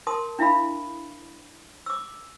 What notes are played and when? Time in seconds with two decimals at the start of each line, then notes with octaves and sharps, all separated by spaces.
0.07 A#4 A5 C6 D#6
0.39 D4 E4 E5 F5 B5
1.86 D6 E6